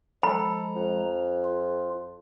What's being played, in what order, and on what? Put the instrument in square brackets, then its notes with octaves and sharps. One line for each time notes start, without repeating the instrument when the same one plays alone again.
[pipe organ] F3 G#3 A#5 [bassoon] A4 [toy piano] B5
[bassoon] F2
[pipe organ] F4